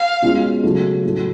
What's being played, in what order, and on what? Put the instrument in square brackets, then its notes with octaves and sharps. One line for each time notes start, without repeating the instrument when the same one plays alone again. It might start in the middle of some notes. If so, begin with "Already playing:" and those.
Already playing: [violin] F5
[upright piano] B2 G#3 C#4 F4
C#3 F#3 A3 F4
A2 F#3 A3